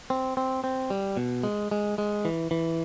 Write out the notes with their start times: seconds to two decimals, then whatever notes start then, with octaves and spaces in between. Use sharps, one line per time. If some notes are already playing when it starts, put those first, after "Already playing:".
0.10 C4
0.37 C4
0.64 C4
0.90 G3
1.17 B2
1.43 G#3
1.71 G#3
1.98 G#3
2.25 E3
2.51 E3